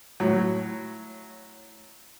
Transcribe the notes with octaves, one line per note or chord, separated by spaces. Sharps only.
A2 F#3